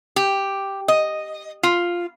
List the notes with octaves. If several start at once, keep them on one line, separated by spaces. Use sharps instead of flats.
G4
D#5
F4